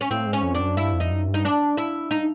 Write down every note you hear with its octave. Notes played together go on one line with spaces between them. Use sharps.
C#4
A2 C4
G#2
C#4
F2
D4
F#2
G2 E4
F2
D#4
F#2
G2
D#4
D4
E4
D#4